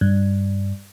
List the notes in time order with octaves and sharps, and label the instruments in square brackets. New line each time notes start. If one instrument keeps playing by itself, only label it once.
[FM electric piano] G2